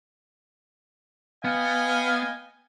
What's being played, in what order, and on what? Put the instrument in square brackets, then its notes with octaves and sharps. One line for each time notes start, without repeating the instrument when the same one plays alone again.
[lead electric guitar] B3 [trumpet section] D#5 G5 G#5 [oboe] F5